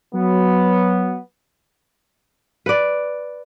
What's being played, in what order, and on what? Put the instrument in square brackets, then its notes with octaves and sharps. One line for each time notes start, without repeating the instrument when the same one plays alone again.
[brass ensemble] F#3 B3
[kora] B4 D5